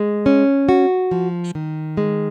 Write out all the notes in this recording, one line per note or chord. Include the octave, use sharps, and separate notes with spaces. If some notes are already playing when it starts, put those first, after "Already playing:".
Already playing: G#3
C#4
F#4
F3
D#3
G#3